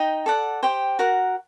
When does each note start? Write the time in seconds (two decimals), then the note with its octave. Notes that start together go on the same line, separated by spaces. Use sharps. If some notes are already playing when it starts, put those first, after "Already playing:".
Already playing: D#4 D#5 G5
0.26 A4 D5 F#5
0.63 G4 C5 G5
0.99 F#4 A#4 F#5